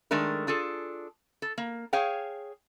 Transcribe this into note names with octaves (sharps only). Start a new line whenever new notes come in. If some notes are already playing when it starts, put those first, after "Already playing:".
D#3 G#3 A3 D4 A#4
D4 F4 G#4 A4
A4
A#3
G#4 C#5 F5 G5